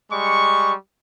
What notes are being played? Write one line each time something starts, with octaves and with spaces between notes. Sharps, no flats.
G3 G#3 C#6